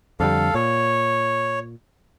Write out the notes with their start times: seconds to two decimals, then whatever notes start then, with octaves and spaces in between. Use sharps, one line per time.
0.20 F2 D3 G3 A4 F5
0.55 A#2 C#5